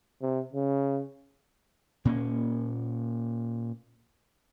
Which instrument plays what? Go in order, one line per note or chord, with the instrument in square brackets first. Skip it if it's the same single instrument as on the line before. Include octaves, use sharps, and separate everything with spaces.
[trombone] C3
C#3
[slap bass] A#2 A#3 B3 C#4